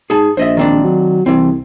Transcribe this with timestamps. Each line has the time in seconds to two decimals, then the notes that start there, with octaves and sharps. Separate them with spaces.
0.10 G#2 G#4 A5
0.37 A#1 C5 D#5 E5
0.57 D#3 C4 D4
0.84 F#3
1.26 C2 E3 C4